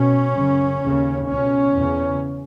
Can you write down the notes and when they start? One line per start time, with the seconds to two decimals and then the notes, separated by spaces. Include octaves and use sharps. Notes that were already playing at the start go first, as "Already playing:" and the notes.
Already playing: B2 C#4
0.34 F#2 C#3
0.81 D#2 C#3
1.28 C#2 B2 C#4
1.74 E2 C#3